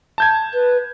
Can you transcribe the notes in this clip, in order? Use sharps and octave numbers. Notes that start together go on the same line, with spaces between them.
A5 G6 G#6
B4